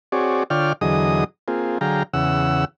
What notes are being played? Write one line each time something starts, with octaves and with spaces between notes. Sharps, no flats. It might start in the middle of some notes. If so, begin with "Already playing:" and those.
C4 F#4 G#4 C#5 D5
D3 F4 C#5 D5 G5 F6
E2 D3 F#3 G#4 D#5 D#6
A#3 C4 F4 G#4
D3 F#3 G#4 F5 G5 A#5
E2 C#3 F#5 E6